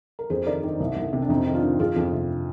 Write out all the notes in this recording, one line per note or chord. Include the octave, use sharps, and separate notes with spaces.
A#4
F2 G#4 C5
D#3 A#4 D5
D#3
C2
C2
C3
D4
F2 C4 D#4
D#3
D4 F4
D#3
F2 F4 G#4
F2
C3